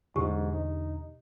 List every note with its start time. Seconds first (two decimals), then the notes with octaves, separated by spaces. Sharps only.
0.16 E2 G#2 B2 D3 G4
0.54 D#4